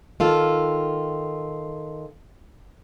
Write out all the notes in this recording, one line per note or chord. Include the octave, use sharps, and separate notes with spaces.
D#3 F4 A4